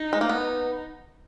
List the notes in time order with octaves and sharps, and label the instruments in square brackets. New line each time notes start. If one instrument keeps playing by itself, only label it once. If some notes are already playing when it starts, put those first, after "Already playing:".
Already playing: [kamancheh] D#4
[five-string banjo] G#3
A#3
B3